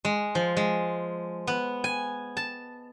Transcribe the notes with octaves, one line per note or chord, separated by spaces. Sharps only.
G#3
F3
G#3
B3
G#5
A5